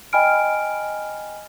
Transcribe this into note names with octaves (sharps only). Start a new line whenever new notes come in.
D#5 G5 G#5 B5 F6 D7